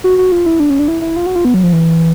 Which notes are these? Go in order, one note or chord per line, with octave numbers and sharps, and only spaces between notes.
F#4
F#4
F4
E4
D4
C#4
D4
E4
E4
F4
F#4
F4
B3
F#3
F3
E3